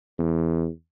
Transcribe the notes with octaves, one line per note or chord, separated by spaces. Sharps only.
E2